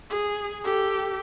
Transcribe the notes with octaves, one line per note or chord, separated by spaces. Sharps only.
G#4
G4 A4